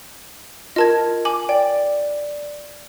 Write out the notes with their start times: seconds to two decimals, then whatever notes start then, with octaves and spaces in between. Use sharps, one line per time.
0.76 F4 A#4 D#5 A5 G#6
1.25 G#5 D6 F#7
1.49 D5 G5